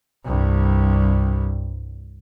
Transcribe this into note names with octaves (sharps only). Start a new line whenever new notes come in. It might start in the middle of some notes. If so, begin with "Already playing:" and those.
C2 G2